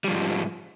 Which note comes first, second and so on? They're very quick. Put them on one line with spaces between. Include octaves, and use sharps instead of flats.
G3 F3 G#2